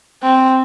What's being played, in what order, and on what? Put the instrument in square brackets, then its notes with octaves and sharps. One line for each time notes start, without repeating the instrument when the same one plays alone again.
[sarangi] C4